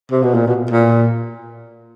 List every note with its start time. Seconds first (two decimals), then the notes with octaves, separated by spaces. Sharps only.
0.11 C3
0.23 B2
0.34 A#2
0.47 B2
0.71 A#2